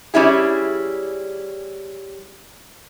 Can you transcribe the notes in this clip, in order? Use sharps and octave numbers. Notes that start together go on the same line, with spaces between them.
G3 C#4 E4 G#4